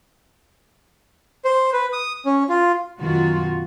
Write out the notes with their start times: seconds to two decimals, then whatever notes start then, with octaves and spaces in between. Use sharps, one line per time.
1.45 C5
1.73 B4
1.93 D#6
2.26 C#4
2.49 F4
3.00 F#2 B2 D#3 F4 F#4